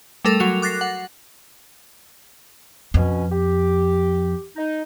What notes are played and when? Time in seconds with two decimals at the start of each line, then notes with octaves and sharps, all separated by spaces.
0.25 G3 A3 A4 A#4 D6 F7
0.40 F#3 F#4 F7
0.62 D6 F#6 A6 A#6 C7
0.81 F#5
2.94 F2 B2 C#4
3.32 G4
4.56 D#4